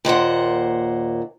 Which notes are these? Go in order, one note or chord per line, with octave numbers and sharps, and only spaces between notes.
D#2 A#2 C5 F#5